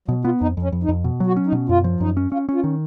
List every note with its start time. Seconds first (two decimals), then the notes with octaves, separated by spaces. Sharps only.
0.08 B2 F#3
0.25 B3 F4
0.41 F2 D#4
0.57 F2
0.62 C#4
0.72 F2
0.84 D#4
0.88 F2
1.04 B2
1.20 F#3
1.26 F#4
1.36 C#4
1.47 D#4
1.52 B2
1.69 F#2 F4
1.84 F3
2.00 F#2 D#4
2.17 C#4
2.32 C#4 F4
2.49 C#4
2.54 F4
2.64 D#3